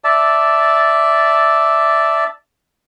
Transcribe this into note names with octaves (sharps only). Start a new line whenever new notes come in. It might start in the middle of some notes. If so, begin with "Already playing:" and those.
D5 E5 A5